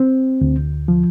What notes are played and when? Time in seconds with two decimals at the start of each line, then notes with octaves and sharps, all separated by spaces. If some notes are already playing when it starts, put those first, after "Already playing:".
Already playing: C4
0.41 D2
0.88 F3